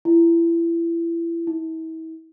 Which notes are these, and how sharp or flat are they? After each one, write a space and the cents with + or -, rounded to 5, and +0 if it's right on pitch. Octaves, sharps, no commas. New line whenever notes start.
E4 +30
E4 -40